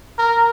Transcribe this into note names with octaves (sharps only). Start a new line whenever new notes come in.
A#4